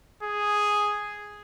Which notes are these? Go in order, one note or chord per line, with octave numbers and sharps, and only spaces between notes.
G#4